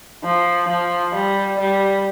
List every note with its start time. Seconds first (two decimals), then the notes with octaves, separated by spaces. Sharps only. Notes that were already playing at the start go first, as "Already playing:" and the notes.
0.23 F3
0.69 F3
1.15 G3
1.60 G3